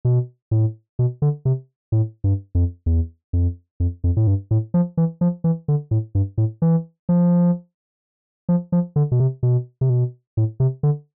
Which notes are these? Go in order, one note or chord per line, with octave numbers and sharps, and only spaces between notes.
B2
A2
B2
D3
C3
A2
G2
F2
E2
F2
F2
F2
A2
G2
A2
F3
E3
F3
E3
D3
A2
G2
A2
E3
F3
F3
F3
D3
B2
C3
B2
C3
B2
A2
C3
D3